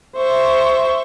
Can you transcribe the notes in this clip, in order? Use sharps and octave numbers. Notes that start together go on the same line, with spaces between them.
C5 E5 C#6